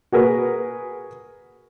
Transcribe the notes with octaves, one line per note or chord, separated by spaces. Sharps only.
F#4 G#4 A#4 B4